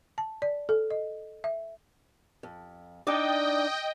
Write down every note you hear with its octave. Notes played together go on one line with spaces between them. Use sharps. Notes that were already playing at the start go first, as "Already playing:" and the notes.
A5
D5
A4
D#5
E5
F2
D4 D#4 D5 D#5 G5